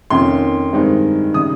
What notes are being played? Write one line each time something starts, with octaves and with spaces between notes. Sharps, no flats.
F2 D#3 A#3 C#4 C6
G2 D#3 G#3 C4 D#4
C#3 G3 D#6